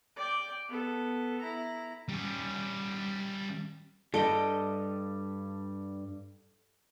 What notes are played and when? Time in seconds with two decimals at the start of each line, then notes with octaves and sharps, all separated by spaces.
0.16 D5 G5
0.68 B3 A4
1.40 E4 A#5
2.09 G3 C#4
4.14 G2 G3 A4 D#5 G5